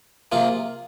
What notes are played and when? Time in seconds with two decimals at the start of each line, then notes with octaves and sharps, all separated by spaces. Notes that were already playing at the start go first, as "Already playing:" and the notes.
0.32 C3 F3 A#3 F4 G#4